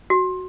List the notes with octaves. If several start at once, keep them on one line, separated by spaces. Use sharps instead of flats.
F#4